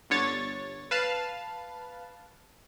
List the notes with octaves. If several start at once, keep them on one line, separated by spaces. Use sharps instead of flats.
G1 D3 C#5 A6
B4 F5 A5